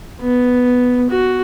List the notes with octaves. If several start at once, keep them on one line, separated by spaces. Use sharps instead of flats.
B3
F#4